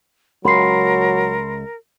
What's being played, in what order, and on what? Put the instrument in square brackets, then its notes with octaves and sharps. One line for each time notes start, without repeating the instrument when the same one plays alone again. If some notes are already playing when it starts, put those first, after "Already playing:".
[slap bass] C#2 [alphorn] F#3 [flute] A#4 [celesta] B5 C6 C7